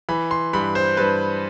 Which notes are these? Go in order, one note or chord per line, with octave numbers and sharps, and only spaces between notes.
E3 B5
C6
G2 B5
C5
G2 B4